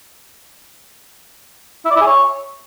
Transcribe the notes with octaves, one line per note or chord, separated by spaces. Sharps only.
E4
D5
E4
G#4
C#5